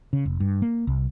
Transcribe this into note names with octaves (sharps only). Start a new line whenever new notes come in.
C#3
F1
G2
A#3
C2